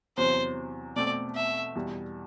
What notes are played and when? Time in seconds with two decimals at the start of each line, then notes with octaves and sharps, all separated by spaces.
0.17 E2 C3 F#3 C5
0.96 B2 A3 C4 D5
1.35 E5
1.75 E2 B2 G3